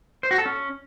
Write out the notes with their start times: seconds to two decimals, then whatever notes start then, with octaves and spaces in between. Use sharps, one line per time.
0.23 C5
0.31 F#4
0.38 A4
0.46 C#4